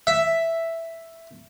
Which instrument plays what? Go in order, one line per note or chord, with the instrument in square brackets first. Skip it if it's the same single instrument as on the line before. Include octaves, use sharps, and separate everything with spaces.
[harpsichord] E5